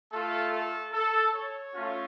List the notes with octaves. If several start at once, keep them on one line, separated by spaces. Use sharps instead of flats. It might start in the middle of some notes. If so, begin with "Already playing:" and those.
A3 F4 A4
A4
A4
C#5
A3 C#4 F4